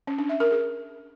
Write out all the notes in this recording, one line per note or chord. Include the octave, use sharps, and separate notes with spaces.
C#4
D4
E5
A#4
G#4